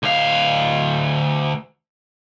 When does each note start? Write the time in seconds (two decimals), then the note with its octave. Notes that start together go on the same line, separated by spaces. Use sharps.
0.03 D2 F5